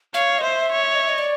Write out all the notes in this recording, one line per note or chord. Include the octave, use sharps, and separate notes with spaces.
C#5 F5
D#5
C5 E5
C#5
D#5
E5
D#5
D5